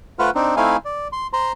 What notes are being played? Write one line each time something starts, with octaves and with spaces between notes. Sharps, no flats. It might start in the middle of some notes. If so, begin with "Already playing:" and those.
A3 F4 B4 C5 F#5 F6
C4 D4 D#4
A3 C4 D#4 E4 F5 G#5
D5
C6
C5 A#5 C6